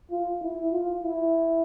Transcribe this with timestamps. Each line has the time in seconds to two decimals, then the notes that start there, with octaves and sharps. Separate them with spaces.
0.11 F4
0.41 E4
0.72 F4
1.02 E4